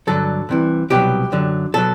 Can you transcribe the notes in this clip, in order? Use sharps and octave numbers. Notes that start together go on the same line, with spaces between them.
G2 D3 F#3 A4
C2 C3 E3
C2 B2 F#3 G4
F#2 D3 F#3
B2 F#3 A4